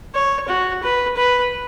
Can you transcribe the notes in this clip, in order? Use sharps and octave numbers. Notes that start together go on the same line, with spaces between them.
C#5
F#4
B4
B4